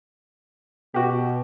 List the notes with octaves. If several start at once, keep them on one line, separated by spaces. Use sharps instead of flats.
B2 F#4 G4